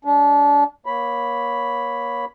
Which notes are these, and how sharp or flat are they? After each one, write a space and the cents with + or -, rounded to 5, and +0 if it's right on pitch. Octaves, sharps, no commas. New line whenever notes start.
G#3 -45 D4 -30
A#3 +25 C#5 +0 B5 +0